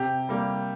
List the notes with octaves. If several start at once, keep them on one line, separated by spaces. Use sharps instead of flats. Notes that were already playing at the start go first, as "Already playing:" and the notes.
Already playing: C3 G4
G3 A#3